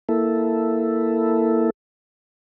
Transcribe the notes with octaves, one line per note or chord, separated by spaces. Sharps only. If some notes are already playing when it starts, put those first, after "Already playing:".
A#3 E4 A4